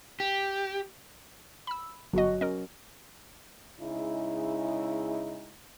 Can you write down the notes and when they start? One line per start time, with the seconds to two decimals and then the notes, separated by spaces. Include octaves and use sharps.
0.20 G4
1.67 B5 E6
2.13 G1 F#3 F#4 D#5
2.41 C#4 A#4 D#5
3.80 C#3 G#3 D#4 E4